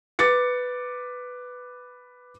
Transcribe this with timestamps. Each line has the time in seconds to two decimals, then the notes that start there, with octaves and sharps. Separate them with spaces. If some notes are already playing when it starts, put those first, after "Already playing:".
0.19 B4 D6 A6 C#7